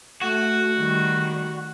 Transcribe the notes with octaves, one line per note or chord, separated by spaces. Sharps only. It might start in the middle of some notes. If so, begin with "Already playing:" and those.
A3 F#4
D#3 G3